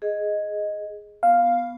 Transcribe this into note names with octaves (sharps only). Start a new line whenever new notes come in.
G#4 D#5
B3 F5